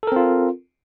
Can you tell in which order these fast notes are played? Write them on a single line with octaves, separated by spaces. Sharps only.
A4 A#4 C4 F4